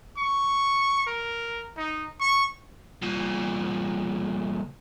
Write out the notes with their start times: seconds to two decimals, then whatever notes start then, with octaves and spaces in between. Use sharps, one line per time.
0.17 C#6
1.07 A#4
1.77 D#4
2.21 C#6
3.03 C2 A#2